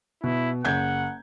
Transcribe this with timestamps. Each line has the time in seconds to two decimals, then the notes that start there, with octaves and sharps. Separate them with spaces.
0.24 B2 E4
0.65 F#1 F#5 G6 G#6